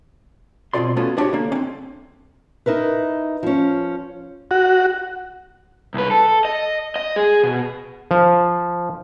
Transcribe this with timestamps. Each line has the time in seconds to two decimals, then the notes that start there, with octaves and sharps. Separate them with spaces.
0.73 B2 C4 F4 G4 D5 C6
0.96 A3 B3 C#4 F4 F#4
1.17 B3 D4 F#4 G4 C#5
1.33 D3 A#3
1.52 C4 C#4
2.66 D#4 E4 A#4 B4
3.43 F3 C#4
4.51 F#4
5.94 C2 B4
6.11 A4
6.45 D#5
6.96 D#5
7.16 G#4
7.44 B2
8.11 F3